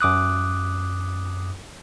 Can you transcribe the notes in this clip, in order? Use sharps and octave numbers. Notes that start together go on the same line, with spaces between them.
F#2 D6 D#6 F#6